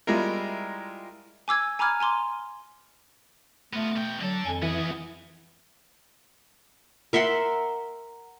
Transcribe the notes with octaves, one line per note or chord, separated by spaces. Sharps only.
G3 G#3 E4 F4 A#4
G#5 D6 E6 G#6
G#5 A#5 B5 D6 F6 G#6
G#5 A#5 C6 D6
A3 B3 F4
B2 G5
D3 F#3 A4
F2 G#5
E3 B3 G#4
A#4 E5 F#5 C6